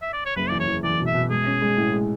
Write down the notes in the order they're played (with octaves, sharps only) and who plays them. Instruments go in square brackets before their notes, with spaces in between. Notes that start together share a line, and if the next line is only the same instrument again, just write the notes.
[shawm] E5
D5
C#5
[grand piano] F#1 [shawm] B4
[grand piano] E2 [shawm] D5
[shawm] C#5
[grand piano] E2
[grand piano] E2 [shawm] D5
[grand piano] B2
[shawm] E5
[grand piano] B2
[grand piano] G#3 [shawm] G#4
[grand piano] C#4
G#3
A2
G#3